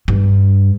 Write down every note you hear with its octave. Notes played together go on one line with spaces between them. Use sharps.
G2